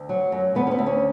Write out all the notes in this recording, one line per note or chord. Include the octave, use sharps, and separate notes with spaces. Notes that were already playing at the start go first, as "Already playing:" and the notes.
Already playing: D2
F#3
F#2
D2 B3
C#4
B3
D2
C#4